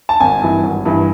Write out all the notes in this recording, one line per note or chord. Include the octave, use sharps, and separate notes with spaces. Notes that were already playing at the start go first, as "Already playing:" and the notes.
A5
G#1 G#5
G2 E3
G#1
G2 E3